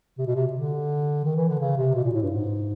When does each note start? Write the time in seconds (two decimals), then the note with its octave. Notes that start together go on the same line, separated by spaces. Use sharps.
0.18 C3
0.27 B2
0.35 C3
0.53 D3
1.25 D#3
1.36 E3
1.48 D3
1.60 C#3
1.78 C3
1.95 B2
2.04 A#2
2.14 A2
2.22 G2
2.31 G#2